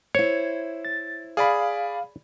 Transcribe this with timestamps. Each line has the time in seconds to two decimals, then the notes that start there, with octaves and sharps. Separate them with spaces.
0.15 E4 C5 C#5
0.85 A6
1.37 G#4 D5 F5 B5